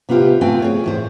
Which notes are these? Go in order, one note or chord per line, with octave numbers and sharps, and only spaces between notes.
C3 B3 E4 F4 G4
A3 B3 C4 F4 G5 G#5
G#4 C#5
E2 A2 C5